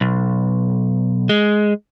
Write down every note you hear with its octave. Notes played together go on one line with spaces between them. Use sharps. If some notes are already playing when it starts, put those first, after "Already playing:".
B1
G#3